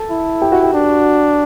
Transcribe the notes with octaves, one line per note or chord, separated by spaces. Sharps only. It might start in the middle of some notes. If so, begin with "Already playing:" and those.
Already playing: A4 A5
E4
G4 G5
F#4 F#5
G4 G5
D4